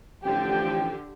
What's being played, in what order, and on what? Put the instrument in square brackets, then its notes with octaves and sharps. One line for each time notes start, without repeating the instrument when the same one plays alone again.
[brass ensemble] A1 F3 G5 [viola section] D3 G4